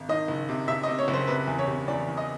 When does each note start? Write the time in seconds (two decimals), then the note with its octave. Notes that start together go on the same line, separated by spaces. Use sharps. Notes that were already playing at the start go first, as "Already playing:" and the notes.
Already playing: G#1
0.09 D#3 D#5
0.28 F#1
0.49 C3
0.68 C3 E5
0.83 C3 D#5
0.98 C#5
1.08 F#1
1.13 C5
1.28 C3 B4
1.47 E2
1.59 C#5
1.67 C3
1.88 E2 D5
2.08 E2
2.17 D#5